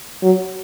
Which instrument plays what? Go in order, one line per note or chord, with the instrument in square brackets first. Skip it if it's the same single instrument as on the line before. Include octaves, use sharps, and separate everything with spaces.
[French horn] F#3